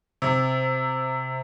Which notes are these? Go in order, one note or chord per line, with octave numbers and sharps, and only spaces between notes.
C3